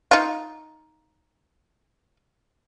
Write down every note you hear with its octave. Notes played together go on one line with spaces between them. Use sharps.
D#4 F4